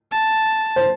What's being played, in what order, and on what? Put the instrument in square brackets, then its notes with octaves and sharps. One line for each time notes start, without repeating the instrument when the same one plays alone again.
[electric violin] A5
[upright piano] C5